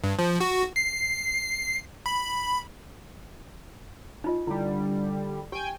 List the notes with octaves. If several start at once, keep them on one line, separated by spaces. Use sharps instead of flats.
G2
F3
F#4
C7
B5
D#4 F4 D#5
D3 G3 E4
G4 G5 G#5